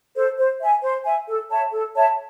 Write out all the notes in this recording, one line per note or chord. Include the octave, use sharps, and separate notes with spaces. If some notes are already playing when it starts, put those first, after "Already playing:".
A4 C5
C5
E5 G#5
C5
E5 G#5
A4
C#5 E5 A5
A4
C#5 E5 A5